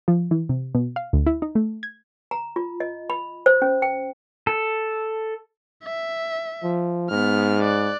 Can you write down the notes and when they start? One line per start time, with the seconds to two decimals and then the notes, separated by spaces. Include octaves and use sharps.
0.08 F3
0.31 E3
0.49 C3
0.75 B2
0.96 F5
1.13 D2
1.27 E4
1.42 D#4
1.55 A3
1.83 G#6
2.31 A#5
2.56 F4
2.80 D#5
3.10 B5
3.46 C5
3.62 C#4
3.82 G5
4.47 A4
5.84 E5
6.63 F3
7.11 G#2 B3 F6
7.62 D5 F#6